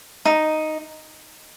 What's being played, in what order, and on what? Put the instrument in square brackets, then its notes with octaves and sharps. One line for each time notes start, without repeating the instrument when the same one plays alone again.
[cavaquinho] D#4